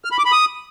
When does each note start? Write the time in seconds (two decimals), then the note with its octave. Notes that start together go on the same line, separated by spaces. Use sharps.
0.05 F6
0.12 B5
0.18 D6
0.25 B5
0.32 D#6